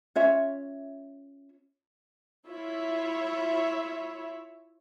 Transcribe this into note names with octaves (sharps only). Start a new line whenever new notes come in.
C#4 F4 C#5 E5
E4 F4 C#5 E5